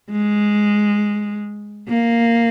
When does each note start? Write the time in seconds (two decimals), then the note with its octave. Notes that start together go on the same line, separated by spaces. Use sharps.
0.11 G#3
1.89 A#3